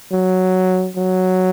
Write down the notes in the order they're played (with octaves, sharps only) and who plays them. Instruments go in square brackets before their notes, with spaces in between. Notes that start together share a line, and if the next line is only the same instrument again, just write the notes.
[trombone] F#3
F#3